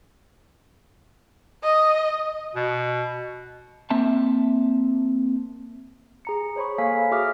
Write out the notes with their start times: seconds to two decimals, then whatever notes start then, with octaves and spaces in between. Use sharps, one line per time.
1.63 D#5
2.55 B2
3.90 A#3 C4 E5 A5
6.25 G#4 A#5 C#7
6.56 C5 C#5 B5 C#6
6.78 A#3 A4 C#5 F5 G#5 B6
7.11 F#4 G#4 E5 D6 D#6 F6